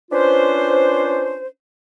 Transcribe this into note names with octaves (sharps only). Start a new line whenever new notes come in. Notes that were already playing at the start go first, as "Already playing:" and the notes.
C#4 D4 F4 B4 C5